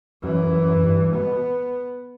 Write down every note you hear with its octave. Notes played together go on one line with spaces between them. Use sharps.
F#2 E3
F#2
G2
B2 B3